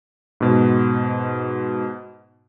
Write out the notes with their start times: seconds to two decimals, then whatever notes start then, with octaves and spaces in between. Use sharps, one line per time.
0.40 G#2 B2